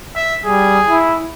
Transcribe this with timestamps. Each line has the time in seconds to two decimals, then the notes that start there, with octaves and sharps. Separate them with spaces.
0.16 E5
0.46 G3 G#4
0.89 E4